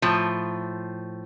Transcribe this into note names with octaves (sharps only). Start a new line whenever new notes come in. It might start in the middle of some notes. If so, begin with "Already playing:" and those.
A2 F3